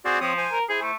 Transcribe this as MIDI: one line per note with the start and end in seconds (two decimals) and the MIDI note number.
0.05 0.17 60
0.05 0.19 66
0.05 0.19 68
0.05 0.19 74
0.21 0.46 53
0.21 0.33 60
0.21 0.33 73
0.21 0.33 87
0.38 0.59 72
0.38 0.59 80
0.52 0.64 70
0.69 0.91 64
0.69 0.80 68
0.69 0.91 72
0.82 0.95 57